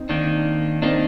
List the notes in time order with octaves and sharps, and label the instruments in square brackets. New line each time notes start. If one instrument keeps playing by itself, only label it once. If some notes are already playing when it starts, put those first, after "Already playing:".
Already playing: [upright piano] C4 D#4
[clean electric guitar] D#3 A#3 D4
[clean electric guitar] D#3 A#3 D4 [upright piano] C4 D#4